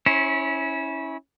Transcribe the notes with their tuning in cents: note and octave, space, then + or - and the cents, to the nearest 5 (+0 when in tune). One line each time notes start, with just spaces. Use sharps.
C#4 +0 E4 -25 C5 +40